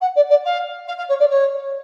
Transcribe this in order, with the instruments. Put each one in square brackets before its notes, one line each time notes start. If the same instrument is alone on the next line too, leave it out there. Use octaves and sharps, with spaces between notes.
[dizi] F#5
D5
D5
F5
F5
F5
C#5
D5
C#5